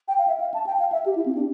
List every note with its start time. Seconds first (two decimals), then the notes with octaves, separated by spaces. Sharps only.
0.08 G5
0.18 F5
0.28 E5
0.40 F5
0.54 A5
0.67 G5
0.80 F5
0.92 E5
1.06 G4
1.16 E4
1.26 C4
1.35 D4